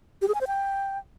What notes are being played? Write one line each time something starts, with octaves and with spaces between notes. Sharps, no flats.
G4
G#4
G#5
C5
G5